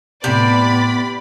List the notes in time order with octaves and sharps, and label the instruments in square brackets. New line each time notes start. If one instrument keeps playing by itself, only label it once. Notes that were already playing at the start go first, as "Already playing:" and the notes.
[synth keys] A2 G4 [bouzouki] C3 [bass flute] B3 [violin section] D5 B5